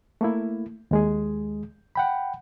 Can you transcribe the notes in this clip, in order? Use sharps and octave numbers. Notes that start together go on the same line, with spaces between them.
A3 A#3 E4
D#2 G#3 G#4
F#5 G5 B5